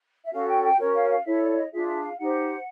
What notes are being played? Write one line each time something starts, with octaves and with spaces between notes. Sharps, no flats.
E5
C#4 F#4 A4 F5
G5
G5
C#4 F#4 A#4 C#5
F5
F5
E4 A4 C#5 E5
D5
D#5
D4 F4 G#4 E5
E5
F5
D#4 G4 C5 F#5